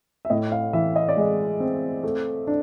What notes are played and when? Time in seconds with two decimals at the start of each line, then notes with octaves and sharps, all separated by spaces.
0.25 E5
0.30 A2 D#5
0.52 F5
0.73 E3 E5
0.96 D#5
1.09 D5
1.17 G#3 D#5
1.60 C4
2.03 A3
2.47 D4